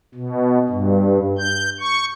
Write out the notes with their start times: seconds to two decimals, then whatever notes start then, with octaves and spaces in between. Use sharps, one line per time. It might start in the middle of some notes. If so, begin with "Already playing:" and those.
0.15 B2
0.69 G2
1.38 G6
1.80 C#6